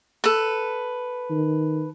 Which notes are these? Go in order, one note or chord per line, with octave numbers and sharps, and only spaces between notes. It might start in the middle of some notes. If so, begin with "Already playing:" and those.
A4 B4
D#3